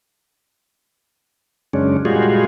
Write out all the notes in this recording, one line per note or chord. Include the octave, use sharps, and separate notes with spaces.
F#2 C#3 G#3 C#4 D4
A#2 G3 G#3 F4 F#4 G#4